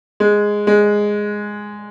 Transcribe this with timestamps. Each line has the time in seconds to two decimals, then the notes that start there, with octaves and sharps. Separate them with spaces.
0.20 G#3
0.67 G#3